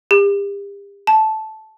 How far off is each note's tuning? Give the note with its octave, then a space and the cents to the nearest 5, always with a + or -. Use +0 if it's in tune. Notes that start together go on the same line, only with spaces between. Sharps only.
G4 +40
A5 -10